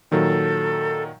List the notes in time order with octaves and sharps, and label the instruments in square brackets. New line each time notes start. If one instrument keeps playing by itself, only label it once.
[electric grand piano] A#2 D#3 F#3 [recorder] A4